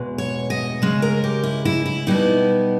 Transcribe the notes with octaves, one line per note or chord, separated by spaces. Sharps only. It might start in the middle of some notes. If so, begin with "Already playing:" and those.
Already playing: E2 B2 G#3
C#5
D#5
C#3 G#3 C#4
A#4
G4
E4
E4
E4
B2 G3 B3 D#4 E4